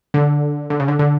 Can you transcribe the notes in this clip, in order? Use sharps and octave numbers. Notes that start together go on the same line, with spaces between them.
D3
D3
C#3
D3
D3